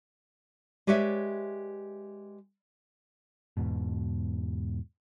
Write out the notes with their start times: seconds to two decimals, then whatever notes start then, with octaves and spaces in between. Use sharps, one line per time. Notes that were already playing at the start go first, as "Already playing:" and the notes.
0.87 G#3 G4 B4 C#5 D5 E5
3.57 E2 G#2 B2